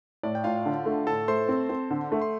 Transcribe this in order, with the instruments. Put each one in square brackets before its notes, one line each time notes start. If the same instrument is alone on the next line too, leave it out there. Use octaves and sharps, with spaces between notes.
[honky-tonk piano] A2 [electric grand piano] D5
[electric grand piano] G5
[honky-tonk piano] A2 [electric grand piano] F4 F5
[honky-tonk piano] D3
A3
[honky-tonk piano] A2 [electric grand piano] A4 A5
[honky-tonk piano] A3 [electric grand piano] C5 C6
[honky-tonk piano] C4
C4
D3
A3
[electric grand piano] C6